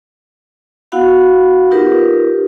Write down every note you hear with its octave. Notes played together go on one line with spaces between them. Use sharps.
B3 E4 F#4 F5 F#5 B5
D#4 F4 G4 A#4 B4